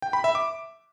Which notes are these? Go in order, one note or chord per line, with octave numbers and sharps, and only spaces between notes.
G5
B5
E5
D6